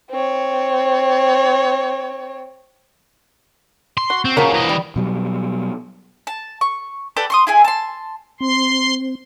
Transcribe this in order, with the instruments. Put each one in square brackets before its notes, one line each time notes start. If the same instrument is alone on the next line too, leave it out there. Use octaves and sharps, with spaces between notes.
[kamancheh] C4 C#5
[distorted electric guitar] C6
[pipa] F#4
[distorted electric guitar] C4
[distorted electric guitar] C#3 [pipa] F3 F#3 A#3
[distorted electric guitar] E3 D#5
[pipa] G3
[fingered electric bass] B2 F#3 G3
[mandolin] A5
C#6
A4 B4 D5 G5
C6 C#6 D#6
E4 G#4 G#5
A5 C6
[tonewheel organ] C4 [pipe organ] C6